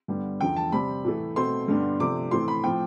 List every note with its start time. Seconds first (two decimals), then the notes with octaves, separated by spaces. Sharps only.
0.08 G2 D3 G3 B3
0.40 E2 D3 F3 G5
0.56 A5
0.72 C3 G3 C4 B5
1.04 A2 E3 A3
1.36 B2 A3 C4 C6
1.68 G2 D3 G3 B3 D4
2.00 C3 F3 A3 D4 D6
2.31 A2 E3 A3 C4 C6
2.48 B5
2.64 A2 F3 C4 G5